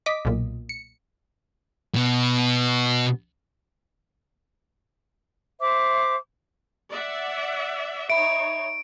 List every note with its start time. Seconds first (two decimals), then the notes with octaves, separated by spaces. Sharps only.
0.06 D#5 D6 B6
0.25 B1 A#2
0.69 C#7
1.94 B2 B3
5.60 C5 E5 D6
6.90 D5 E5 F#5
8.10 D#4 C#5 E5 B5 D7